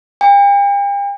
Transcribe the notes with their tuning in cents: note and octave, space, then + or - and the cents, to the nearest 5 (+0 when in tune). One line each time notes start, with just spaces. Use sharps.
G5 +45